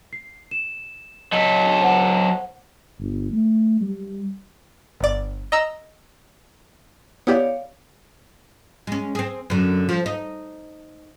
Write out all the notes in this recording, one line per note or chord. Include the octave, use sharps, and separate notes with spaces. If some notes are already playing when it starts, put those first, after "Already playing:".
C7
E7
F#3 A4 D#5 E6 B6
C5 F#5
G1
A3
G3
G1 D5
D#5 A#5 E6
B3 E4 G4 C#5 D5 F5
G#3 C#4
C4 G#4
F#2 D3
F3
D#4